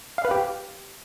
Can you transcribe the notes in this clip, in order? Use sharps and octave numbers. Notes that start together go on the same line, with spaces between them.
F5
B4
G4